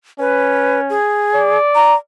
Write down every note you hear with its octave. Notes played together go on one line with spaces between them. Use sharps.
C#4 B4
G#4
D5
A#5